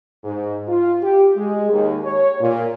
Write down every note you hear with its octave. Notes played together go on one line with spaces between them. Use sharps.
G#2
F4
G4
G#3
D#2
C#5
A#2